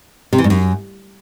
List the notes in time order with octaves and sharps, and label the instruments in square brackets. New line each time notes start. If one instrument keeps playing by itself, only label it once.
[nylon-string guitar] C3
E3
G2
F#2